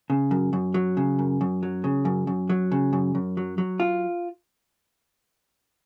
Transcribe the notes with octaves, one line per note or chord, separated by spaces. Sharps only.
C#3
F#2
F#2
F#3
C#3
F#2
F#2
F#3
C#3
F#2
F#2
F#3
C#3
F#2
F#2
F#3
F#3
F4